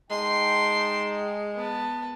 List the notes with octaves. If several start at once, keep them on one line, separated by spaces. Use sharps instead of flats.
G#3 D#4 G5 A5 C6
B3 A5